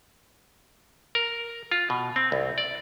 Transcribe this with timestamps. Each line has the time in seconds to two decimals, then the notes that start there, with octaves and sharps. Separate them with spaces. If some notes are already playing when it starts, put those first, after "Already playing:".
1.15 A#4
1.71 F4
1.90 B2
2.16 C4
2.32 C2
2.58 D5